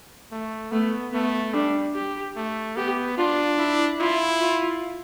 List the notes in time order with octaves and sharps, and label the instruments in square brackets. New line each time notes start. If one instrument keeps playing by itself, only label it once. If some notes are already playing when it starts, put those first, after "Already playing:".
[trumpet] A3
[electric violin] A3 [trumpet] B3
[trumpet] A3 [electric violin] B3
[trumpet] G3 [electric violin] D4
[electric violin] G4
[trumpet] A3
[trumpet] B3 [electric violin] G4
[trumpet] D4 [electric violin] F4
[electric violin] E4
[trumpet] E4 [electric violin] F4
[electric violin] F4